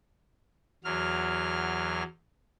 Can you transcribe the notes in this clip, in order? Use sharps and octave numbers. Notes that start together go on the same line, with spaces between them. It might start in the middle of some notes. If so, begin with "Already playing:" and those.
E2 F#3 F6